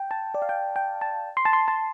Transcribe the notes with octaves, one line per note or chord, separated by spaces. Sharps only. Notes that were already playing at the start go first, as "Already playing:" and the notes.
Already playing: G5
A5
D5
F5
G5
G5
A5
C6
A5
C6
A5